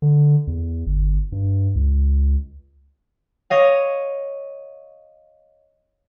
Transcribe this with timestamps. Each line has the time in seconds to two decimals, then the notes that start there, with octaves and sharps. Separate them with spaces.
0.02 D3
0.47 E2
0.87 G1
1.32 G2
1.75 C#2
3.50 C#5 D#5 F5